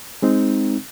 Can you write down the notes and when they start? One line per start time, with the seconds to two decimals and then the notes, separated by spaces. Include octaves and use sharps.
0.22 G#3 C4 D#4